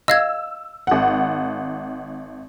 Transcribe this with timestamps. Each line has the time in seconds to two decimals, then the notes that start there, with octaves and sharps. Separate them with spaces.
0.08 D#5 F5 E6 G#6
0.87 G#1 F#5